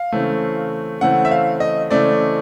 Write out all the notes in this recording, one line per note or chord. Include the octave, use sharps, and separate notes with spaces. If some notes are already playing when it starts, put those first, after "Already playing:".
Already playing: F5
C#3 E3 A3 C4
C#3 E3 A3 C4 F#5
E5
F5
D#5
C#3 E3 A3 C4 D5